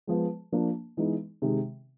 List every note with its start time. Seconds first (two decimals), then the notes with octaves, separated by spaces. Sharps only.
0.07 F3 G#3 B3
0.52 F3 A#3 D4
0.97 E3 G#3 B3 D#4
1.42 C3 D#3 G#3